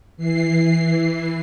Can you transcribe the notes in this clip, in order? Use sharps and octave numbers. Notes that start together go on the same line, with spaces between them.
E3 C7